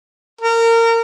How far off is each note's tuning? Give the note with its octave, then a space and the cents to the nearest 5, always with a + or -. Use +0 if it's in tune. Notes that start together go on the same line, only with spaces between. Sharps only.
A#4 -25